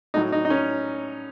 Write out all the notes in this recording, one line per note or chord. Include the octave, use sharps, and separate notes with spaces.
A2 F#3 D#4
D#4
D#4
C#4